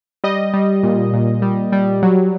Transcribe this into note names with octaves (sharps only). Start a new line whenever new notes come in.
G3 D#5
G3
A#2
A#2
G3
G3
F#3